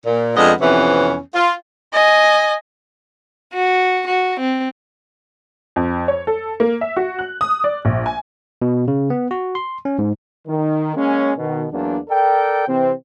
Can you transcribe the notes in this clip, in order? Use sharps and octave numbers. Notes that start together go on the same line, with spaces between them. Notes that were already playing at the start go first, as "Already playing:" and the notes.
A#2
F2 G#3 B3 D4 D#5
F2 C3 E3 B3 C#4
F4
D#5 G#5
F#4
F#4
C4
F2
C#5
A4
A#3
E5
F#4
F#6
D#6
D5
A#1
G#5
B2
C#3
B3
F#4
C6
C#4
G#2
D#3
G#3 A#3 C#4
B2 D#3
E2 F#3 A#3 D4
A4 A#4 D5 G5
C3 E3 C4